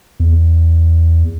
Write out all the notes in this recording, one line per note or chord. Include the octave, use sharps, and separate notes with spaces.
E2